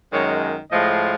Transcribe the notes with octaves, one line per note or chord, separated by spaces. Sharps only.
F#2 D#3 G#3 C#5
A2 F3 G#3 D#5